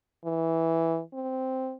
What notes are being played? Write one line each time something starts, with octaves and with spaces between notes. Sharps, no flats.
E3
C4